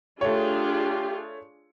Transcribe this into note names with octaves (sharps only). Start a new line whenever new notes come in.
A3 D4 F4 G4 G#4 C#5